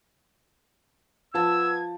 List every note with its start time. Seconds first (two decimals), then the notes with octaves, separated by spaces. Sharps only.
1.34 F3 B3 A5 E6 G#6